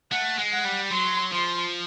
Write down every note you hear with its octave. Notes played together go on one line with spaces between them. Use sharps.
A3 F#5
G#3
F#5
G3
F#3 C6
F3 C6